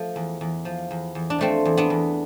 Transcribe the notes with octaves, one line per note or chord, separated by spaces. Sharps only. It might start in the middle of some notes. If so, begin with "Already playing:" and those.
Already playing: F3 A3
E2
E2
F3
E2
E2
D4
F3 A3 C4
E2
B3 D4
E2